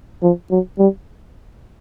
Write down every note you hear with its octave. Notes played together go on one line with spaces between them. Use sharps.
F3
F#3
G3